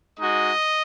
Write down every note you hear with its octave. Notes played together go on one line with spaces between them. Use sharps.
G#3 D#4 F#4 D#5